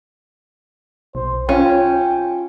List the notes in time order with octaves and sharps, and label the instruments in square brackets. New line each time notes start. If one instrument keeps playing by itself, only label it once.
[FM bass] B1 [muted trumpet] C5
[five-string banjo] C#4 [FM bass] F4 [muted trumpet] G5